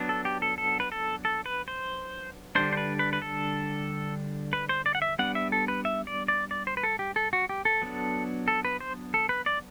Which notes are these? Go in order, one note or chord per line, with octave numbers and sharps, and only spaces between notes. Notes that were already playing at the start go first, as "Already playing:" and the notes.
Already playing: F#3 B3 D4
A4
G4
A4
A4
B4
A4
A4
B4
C5
D3 G3 D4 C5
C5
B4
B4
B4
A4
B4
C5
D5
F#5
E5
G3 B3 D4 F#5
E5
A4
B4
E5
D5
D5
D5
C5
B4
A4
G4
A4
F#4
G4
A4
F#3 B3 D4
A4
B4
C5
A4
B4
D5